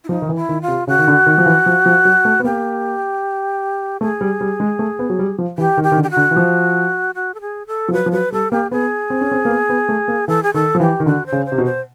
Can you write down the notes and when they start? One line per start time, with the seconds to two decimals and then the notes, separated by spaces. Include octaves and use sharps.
0.04 E4
0.09 F3 D#4
0.22 D#3
0.29 E3
0.35 E4
0.49 D#3
0.62 F4
0.68 C3
0.87 C#3 F#4
0.99 D#3
1.08 D3
1.26 D#3
1.38 F3
1.46 E3
1.66 F3
1.86 F3
2.05 F#3
2.25 A3
2.40 B3
2.44 A#3 G4
4.01 A3 G#4
4.21 G3
4.41 G3
4.60 G#3
4.79 A3
4.99 B3
5.10 F#3
5.19 G3
5.38 F3
5.58 E3 G4
5.77 D#3
5.83 G4
5.92 D#3
5.97 D3
6.03 G4
6.10 F#4
6.17 D3
6.31 E3
6.36 F3
7.15 F#4
7.34 A4
7.41 G#4
7.67 A4
7.88 F3
7.93 F#3 B4
8.06 F3
8.12 F#3 B4
8.32 G3 A4
8.52 A#3 G4
8.71 B3 G#4
9.10 C4
9.21 C#4
9.31 C4
9.45 A#3
9.49 B3
9.69 B3
9.89 A3
10.08 A#3
10.28 E3 A4
10.43 G#4
10.54 D#3 A4
10.75 F3
10.80 E3 G4
11.00 D#3
11.06 D3 F#4
11.26 C5
11.32 C#3
11.45 C5
11.52 C3
11.58 B2
11.65 C5